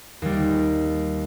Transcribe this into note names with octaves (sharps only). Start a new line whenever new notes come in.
D#2 G3